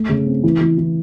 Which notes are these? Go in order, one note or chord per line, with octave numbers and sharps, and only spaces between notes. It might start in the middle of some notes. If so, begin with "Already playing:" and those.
Already playing: A3
C#3
C4
E3
E3
E3